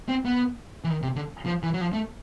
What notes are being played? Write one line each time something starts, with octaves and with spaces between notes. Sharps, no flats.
C4
B3
E3
D#3
C3
D3
F3
E3
F#3
F3
A3